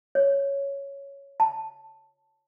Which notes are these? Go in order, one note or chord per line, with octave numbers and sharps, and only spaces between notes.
C#5
A5